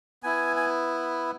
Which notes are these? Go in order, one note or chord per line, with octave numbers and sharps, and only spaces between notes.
B3 E4 G#5
G#5